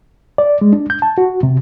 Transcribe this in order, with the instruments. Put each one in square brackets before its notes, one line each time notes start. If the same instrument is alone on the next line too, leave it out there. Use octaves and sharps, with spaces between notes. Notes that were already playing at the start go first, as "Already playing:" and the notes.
[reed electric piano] D5
G#3
D4
G6
A5
F#4
C3